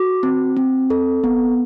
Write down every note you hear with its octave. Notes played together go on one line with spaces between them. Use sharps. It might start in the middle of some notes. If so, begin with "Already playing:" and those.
Already playing: F#4 D6
C4
C4
A4
B3